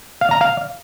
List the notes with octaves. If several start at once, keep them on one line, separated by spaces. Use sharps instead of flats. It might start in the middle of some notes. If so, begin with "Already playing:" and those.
F5
A#5
F5